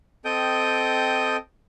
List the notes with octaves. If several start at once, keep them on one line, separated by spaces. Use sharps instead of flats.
C4 A4 D#5 G5 D#6 G6